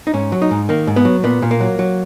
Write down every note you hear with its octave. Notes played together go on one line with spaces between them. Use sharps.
D#4
G#2 C#4
F#3
D#4
G#2
D#3 A#3
G#2
B3
F#3
A#2 B3
A#2
A#3
F#3
F#3